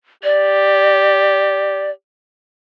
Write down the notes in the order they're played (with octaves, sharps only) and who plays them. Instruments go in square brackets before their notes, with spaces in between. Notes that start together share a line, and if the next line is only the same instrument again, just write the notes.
[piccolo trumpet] G4 [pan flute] D5